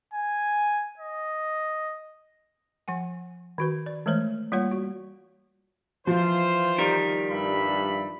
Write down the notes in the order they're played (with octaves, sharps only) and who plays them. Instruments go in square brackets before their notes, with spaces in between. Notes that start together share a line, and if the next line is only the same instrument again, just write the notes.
[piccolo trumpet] G#5
D#5
[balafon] F3 F#5 G#5
D#3 F#4 B4
D5
E3 G#3 A3 C5 C#5
G3 A#3 F4 C#5 F#5
F#4
[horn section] E3 F4 C5 [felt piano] F3
[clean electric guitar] D#3 G3 A#4
[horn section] G2 E5 B5